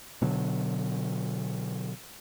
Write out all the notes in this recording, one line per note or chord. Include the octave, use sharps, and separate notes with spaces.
B2 D3 F#3